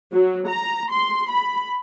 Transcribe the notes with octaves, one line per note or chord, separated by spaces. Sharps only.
F#3
A#5
C6
B5